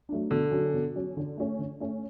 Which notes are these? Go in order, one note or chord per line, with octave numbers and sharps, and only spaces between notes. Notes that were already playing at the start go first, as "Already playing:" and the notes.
F#3 A3 D4
B2 D3
F#3 C#4
B2
F#3 C#4
D3
A3 C#4
D3
A3 C#4